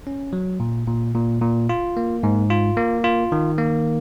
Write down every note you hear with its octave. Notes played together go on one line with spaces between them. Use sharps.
C#4
F#3
A#2
A#2
A#2
A#2
F4
A#3
G#2
F4
A#3
F4
D#3
A#3